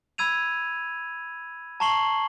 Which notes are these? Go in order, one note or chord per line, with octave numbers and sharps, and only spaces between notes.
B5 E6 G#6 D#7 F7
A5 A#5 C#6 C7 F#7 G7